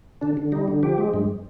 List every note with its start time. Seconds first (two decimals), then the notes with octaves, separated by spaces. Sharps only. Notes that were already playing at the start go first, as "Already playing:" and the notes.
0.21 D3 D4
0.37 D3
0.52 G3 D#4
0.68 D3
0.83 F3 G4
0.98 G#3
1.14 G2